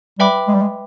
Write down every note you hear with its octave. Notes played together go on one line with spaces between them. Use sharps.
G3 B4 E5 G5 B5 D6
G#3
G3
G#3